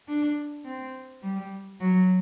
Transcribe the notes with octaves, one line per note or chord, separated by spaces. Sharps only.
D4
C4
G3
F#3